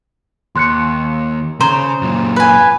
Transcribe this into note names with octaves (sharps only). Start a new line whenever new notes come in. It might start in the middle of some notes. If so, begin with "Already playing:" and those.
D#2 C6 F#6 C#7
C#3 C5 A#5
F#2 A#2
B4 G#5